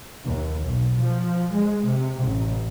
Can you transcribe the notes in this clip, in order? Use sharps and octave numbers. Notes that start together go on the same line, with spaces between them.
D#2
B1
F3
G#3
C3
A1